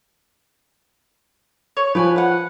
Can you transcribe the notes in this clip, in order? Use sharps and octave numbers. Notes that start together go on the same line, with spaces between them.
C#5
F3 B4 G5 G#5
B4 F#5